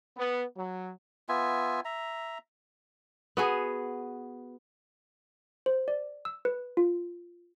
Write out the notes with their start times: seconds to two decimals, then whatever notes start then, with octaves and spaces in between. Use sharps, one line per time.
0.16 B3
0.57 F#3
1.29 B3 F4 E5 G#5
1.85 E5 A#5
3.37 B3 F#4 G#4
5.66 C5
5.88 D5
6.25 E6
6.45 B4
6.77 F4